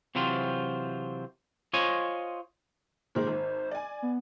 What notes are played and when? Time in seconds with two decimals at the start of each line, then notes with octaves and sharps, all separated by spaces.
0.15 C3 E3 F#3 C4 F4
1.73 F4 C5 C#5 D#5 G#5
3.15 A#2 D#3 G#3 C5
3.27 G#1
3.71 D5 G#5
4.02 B3